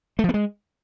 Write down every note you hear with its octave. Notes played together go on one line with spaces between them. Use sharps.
A3
F3
B3
G#3